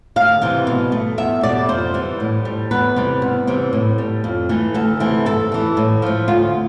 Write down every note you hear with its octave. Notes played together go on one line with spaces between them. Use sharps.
D2 F5
C3 E3 G3
B2
A3
E2 E5
B2 G3 D5
F2 C5
E3 G3
A2
G3
E2 B4
C3 G3
E2
C3 E3 G3
A2
G3
F2
E3 A3
D2 A4
C3 E3 A3
G2 A4
E3 G3
A2
F3 A3
D2 F4